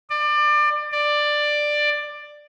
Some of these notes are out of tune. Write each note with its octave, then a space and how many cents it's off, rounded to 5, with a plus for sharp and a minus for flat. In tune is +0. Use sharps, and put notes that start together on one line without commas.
D5 +25
D5 +10